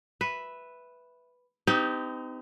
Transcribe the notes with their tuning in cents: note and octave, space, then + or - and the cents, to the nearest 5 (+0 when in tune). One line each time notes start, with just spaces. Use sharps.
B4 +0 E5 +0
C4 -45 D#4 +0 G4 +0